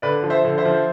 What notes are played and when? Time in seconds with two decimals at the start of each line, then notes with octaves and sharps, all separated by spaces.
0.02 D3 B4 D5
0.23 F3
0.30 C5 E5
0.45 D3
0.58 C5 E5
0.65 F3